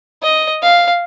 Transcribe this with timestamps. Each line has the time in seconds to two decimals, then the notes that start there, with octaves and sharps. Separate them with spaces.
0.23 D#5
0.62 F5